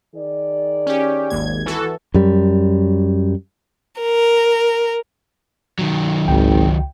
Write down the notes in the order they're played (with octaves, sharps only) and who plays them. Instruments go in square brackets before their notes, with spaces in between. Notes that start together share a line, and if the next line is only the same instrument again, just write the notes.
[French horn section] D#3 G#4 D5
[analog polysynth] C#4 G4
G#1 D#2 G#6
E3 F#4 A4
[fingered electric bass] F#2 G3
[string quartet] A#4
[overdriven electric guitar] D#3 F#3
[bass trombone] G#1 [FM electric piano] C#2 G5